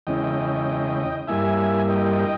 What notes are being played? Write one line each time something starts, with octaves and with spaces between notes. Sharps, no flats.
E2 C#3 G#3 C#4 E4 D#5 G5
G2 G3 A#3 E4 E5 G#5
D#5 G5